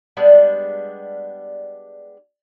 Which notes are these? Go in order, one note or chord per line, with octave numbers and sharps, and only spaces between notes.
G3 G#3 B3 D4